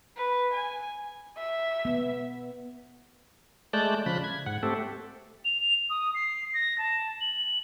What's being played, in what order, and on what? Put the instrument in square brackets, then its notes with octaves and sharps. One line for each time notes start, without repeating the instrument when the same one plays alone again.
[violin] B4
G#5
[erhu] E5
[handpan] B3
[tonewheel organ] G#3 A3 D5 A5 F#6 G6
C#3 F3 B5 F#6
G#6
G#2 F#5
A3 C4 G4 A4
[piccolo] F7
D#6
C7
A#6
A5
F#7